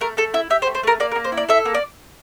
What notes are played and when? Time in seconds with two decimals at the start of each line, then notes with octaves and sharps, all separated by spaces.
0.01 A3 A#4
0.17 A3 A4
0.34 E4 E5
0.50 G4 E5
0.62 C5
0.67 A3
0.75 C5
0.83 A3 A#4
1.00 A#3 D5
1.12 A#4
1.16 A#3
1.24 C5
1.32 E4
1.37 D5
1.49 A4 E5
1.65 A#3
1.74 D5